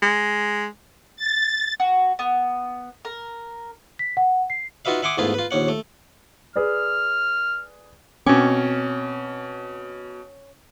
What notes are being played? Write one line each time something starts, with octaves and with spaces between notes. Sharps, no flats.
G#3
A6
F#4
B3
A#4
B6
F#5
C7
D#4 F4 F#4 B4 E5 F5
E5 F#5 G#5 C6 D6 D#6
E2 G#2 A3 F4 G#4 B4
F4 B4
A#1 D#2 C#4 F#5
A3
G#4 B4 D5 F6
B2 C4 C#4 D6